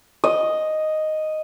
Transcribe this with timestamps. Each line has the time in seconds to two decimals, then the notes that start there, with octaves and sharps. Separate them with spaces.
0.24 D#5